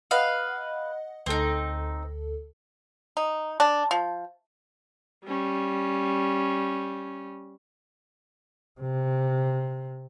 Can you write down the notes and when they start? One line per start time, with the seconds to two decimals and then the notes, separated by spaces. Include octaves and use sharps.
0.11 B4 D#5 F5 F#5
1.26 D2 C4 D#4 A4
3.17 D#4
3.60 D4
3.91 F3
5.25 G3 C#4
8.81 C3